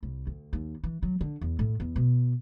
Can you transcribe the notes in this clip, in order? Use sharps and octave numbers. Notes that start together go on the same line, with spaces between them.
C2
D2
D#2
E3
F#3
D3
E2
A2
E2
B2